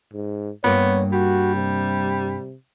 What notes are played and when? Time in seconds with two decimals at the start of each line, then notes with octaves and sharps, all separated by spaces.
0.13 G#2
0.64 G2 A#3 B3 F4 C#5
1.12 G3 F#4
1.55 C3